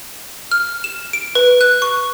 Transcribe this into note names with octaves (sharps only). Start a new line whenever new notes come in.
F6
E7
D7
B4
F#6
C#6